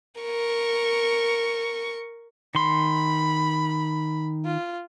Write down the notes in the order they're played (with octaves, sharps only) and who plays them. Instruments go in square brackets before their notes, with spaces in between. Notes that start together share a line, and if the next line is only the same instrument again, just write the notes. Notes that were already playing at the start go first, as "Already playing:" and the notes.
[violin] A#4 C#6
[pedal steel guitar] D#3 C6 [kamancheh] B5
[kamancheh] F4